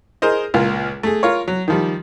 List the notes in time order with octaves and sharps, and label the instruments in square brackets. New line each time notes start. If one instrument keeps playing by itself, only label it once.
[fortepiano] G#4 A#4 C5 D#5
C#2 A#2 F4 A#4
A3 G#4
F4 A#4 C#5
F#3
D#3 F3 G3